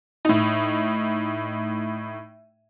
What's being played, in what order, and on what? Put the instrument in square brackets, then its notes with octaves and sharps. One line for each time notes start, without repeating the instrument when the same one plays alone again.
[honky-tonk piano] A2 D#4